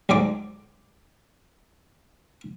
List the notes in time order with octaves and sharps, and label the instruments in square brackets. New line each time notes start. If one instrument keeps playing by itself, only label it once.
[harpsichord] D2 G#2 F#3 D5 D6